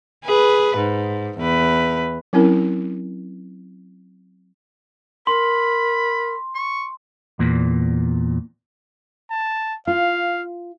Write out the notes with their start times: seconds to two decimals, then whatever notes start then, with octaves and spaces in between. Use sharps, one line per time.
0.24 G#4 B4
0.77 G#2
1.38 E2 B4
2.33 F#3 C4 C#4 E4 A#4
5.27 A#4 B5 C6
6.55 C#6
7.39 E2 A#2
9.30 A5
9.87 F4 F5